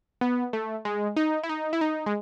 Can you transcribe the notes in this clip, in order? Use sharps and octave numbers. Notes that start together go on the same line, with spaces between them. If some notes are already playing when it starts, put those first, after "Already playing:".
B3
A3
G#3
D#4
E4
D#4
E4
D#4
G#3